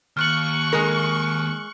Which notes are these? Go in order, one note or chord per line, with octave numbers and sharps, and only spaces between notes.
D#2 C#6 F6 F#6 F#7
G#3 A#4